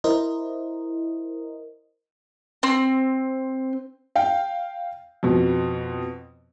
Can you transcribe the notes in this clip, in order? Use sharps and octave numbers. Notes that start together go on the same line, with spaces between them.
E4 A#4 C5 D#5
C4
F5 G5
F2 B2